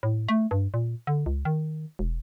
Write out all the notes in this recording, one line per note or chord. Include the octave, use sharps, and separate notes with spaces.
A2
A3
G2
A#2
D3
C#2
D#3
E1